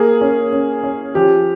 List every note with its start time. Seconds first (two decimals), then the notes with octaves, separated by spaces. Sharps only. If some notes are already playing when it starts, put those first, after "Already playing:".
Already playing: A#3 G#4
0.21 C#4
0.53 C#4
0.83 C#4
1.15 F3 G4